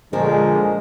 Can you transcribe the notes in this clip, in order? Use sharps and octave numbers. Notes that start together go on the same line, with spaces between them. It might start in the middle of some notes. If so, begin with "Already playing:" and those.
A#2 D3 F3 G#3 A#4